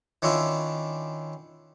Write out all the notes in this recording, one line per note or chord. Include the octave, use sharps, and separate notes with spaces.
D#3 C#4 D4 E4 F4